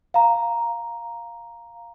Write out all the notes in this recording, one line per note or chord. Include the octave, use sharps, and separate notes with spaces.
F5 A#5